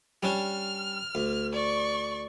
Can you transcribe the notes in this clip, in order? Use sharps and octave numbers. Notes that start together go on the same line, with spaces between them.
G3 C#4 D4 F6
D2
D5 C#6